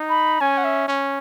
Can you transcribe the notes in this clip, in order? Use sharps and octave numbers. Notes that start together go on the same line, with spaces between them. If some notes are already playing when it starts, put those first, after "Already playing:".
Already playing: D#4
B5
C#4 G#5
F#5
E5
C#4